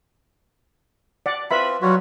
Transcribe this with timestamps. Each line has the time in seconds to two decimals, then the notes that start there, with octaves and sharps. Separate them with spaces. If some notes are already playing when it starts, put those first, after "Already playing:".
1.26 D5 F#5
1.51 C4 F4 B4 E5 B5
1.82 F#3 G3 F4 F#4 C#5